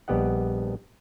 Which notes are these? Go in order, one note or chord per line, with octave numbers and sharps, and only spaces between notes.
A#1 G3 B3 G4 D#5 F#5